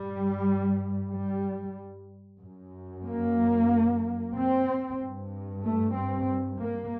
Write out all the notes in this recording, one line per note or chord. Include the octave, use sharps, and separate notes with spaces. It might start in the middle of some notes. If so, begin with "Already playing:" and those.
Already playing: G2 G3
G3
F#2
A#3
C4
G2
A3
C4
A#3